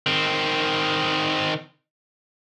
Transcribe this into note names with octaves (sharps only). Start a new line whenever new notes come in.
D#3 C4